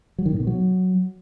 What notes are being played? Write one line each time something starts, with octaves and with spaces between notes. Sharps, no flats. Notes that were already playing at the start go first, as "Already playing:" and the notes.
F#3
D#3
A2
B2
F#3